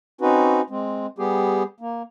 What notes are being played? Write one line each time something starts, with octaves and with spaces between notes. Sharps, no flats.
C4 C#4 D#4 F#4 B4
G#3 C4
G3 B3 G4 G#4
A#3